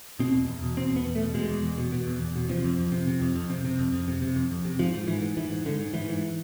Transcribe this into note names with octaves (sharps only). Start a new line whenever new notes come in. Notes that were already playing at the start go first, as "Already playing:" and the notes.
B2 C4
E2
E2
B2
B2 C4
E2 B3
E2
A3
B2
B2 G#3
E2
E2
B2
B2
E2
E2
B2
C3 F3
F2
F2
C3
C3
F2
F2
C3
C3
F2
F2
C3
C3
F2
F2
C3
G#2 F3
G#2
G#2 E3
G#2
G#2 E3
G#2
G#2 D3
G#2
G#2 E3
G#2